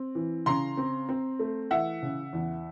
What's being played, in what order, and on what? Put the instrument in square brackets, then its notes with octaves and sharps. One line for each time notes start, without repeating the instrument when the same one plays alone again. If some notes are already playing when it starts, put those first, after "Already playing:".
Already playing: [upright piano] C4
E3
C#3 A#5 C6
C4
C4
A3
E3 E5 F#5
C#3
E2